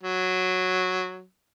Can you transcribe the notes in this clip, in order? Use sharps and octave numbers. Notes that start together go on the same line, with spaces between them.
F#3